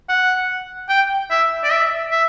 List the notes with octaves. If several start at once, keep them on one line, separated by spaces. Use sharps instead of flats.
F#5
G5
E5
D5
E5
E5